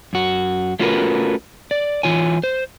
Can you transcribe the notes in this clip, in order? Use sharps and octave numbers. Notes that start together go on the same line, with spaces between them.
F#2 F#4
A3 C#4 F4 F#4 A#4 B4
D5
E3 F4 C#5 G#5
C5